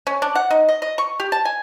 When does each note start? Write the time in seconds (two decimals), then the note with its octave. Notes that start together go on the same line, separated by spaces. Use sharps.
0.07 C#4
0.22 D4
0.35 F#5
0.51 D#4
0.69 D#5
0.82 D#5
0.98 C#6
1.20 G4
1.32 A5
1.45 G#5